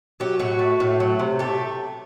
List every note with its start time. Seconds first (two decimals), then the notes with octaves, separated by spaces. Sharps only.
0.20 F#3 G4
0.39 A2 F#4
0.59 A3
0.80 A2
1.00 F#3
1.19 C3
1.39 A3 G4